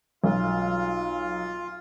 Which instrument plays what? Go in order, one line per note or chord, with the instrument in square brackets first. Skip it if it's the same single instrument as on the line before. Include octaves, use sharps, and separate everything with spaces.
[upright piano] B1 [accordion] F4